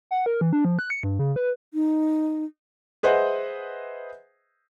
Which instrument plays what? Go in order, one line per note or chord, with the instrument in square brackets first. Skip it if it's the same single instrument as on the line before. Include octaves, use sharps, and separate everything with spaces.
[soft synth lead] F#5
A#4
E3
D4
F3
F#6
C#7
G2
C#3
B4
[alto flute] D#4
[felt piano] G#4 B4 C5 D#5 E5 F#5